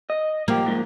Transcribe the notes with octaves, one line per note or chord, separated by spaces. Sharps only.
D#5
F3 A#3 G4
G#2 F3